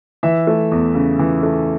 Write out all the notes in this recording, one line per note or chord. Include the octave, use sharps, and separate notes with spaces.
E3 E5
A3
E2
C#3
E3
A3